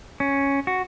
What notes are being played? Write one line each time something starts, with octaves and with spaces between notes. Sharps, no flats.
C#4
F#4